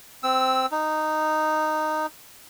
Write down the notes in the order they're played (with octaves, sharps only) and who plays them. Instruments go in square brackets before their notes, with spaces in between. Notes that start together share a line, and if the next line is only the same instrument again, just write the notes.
[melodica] C4 E6
D#4